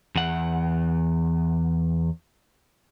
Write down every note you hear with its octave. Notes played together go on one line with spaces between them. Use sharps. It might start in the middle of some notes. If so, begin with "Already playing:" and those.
E2 F#5